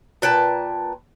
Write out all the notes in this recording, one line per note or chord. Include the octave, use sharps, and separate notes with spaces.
A#2 B4 G5 A5